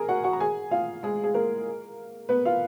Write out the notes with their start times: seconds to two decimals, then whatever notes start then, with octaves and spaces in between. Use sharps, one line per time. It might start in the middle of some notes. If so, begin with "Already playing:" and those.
Already playing: G#4 A#4 G#5 A#5
0.08 F#4 F#5
0.24 F#4 F#5
0.33 A#5
0.40 G#4 G#5
0.71 F4 F5
1.03 G#3 G#4
1.24 G#4
1.34 A#3 A#4
2.29 B3 B4
2.45 F4 F5